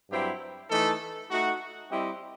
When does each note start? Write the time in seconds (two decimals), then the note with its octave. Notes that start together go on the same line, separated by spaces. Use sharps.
0.10 G2 F#3 C4 E4 G4
0.70 E3 A3 D#4 A4
1.31 A3 D#4 F#4
1.91 G3 C4 E4 G4 D#5